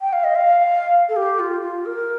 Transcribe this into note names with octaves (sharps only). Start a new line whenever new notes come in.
G5
F5
D#5
F5
A4
G4
F4
F4
A#4